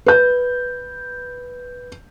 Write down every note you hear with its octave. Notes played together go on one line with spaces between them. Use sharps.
B4 G6